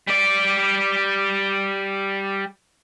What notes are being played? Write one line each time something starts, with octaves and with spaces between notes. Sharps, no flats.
G3 D5